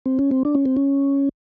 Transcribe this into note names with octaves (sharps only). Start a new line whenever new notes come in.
C4
C#4
C4
D4
C#4
C4
C#4